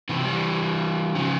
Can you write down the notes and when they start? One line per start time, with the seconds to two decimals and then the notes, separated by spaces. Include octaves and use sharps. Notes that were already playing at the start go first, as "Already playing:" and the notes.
0.09 C3 E3
0.20 F3
0.24 E3 G3
1.15 C#3 F3